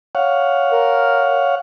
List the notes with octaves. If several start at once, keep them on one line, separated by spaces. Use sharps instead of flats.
C#5 F5 F#5
A#4